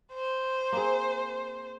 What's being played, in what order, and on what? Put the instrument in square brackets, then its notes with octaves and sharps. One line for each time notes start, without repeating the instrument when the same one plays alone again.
[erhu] C5
[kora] A#3 C4 G#4